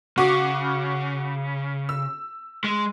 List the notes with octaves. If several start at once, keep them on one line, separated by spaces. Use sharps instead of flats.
C#3 F#4 D6
E6
G#3